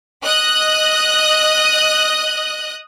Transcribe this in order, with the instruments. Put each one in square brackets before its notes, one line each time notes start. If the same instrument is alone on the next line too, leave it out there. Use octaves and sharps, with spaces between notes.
[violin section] D#5 D#6 F#6